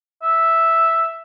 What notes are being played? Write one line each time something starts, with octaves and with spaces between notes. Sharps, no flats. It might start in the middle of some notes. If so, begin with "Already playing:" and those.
E5